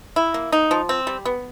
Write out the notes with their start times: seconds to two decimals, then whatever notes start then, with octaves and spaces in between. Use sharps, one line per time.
0.16 E4
0.34 A#3
0.52 D#4
0.71 F3
0.89 C4
1.07 G3
1.25 B3